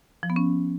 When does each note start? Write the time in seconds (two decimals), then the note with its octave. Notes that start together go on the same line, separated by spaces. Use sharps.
0.23 F3
0.30 B3
0.36 C#4